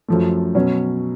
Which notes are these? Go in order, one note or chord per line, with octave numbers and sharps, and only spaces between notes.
F#2 F3 A3
B2 F#3 C#4